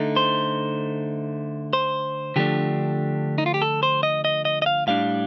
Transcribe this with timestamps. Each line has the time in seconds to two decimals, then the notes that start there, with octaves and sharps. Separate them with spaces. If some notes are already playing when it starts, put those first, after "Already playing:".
Already playing: D3 A3 D#4
0.16 C5
1.73 C5
2.36 D3 F3 A3 D4 G4
3.38 D#4
3.46 F4
3.54 G4
3.62 A4
3.83 C5
4.03 D#5
4.25 D#5
4.45 D#5
4.62 D#5
4.66 F5
4.87 A2 G3 D4 F5